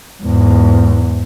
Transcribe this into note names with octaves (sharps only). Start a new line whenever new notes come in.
E2 G#2